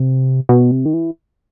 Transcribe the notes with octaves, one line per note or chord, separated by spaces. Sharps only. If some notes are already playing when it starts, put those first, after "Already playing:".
Already playing: C3
B2
C3
D#3
E3